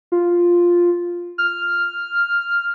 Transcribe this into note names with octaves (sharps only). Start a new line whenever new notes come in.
F4
F6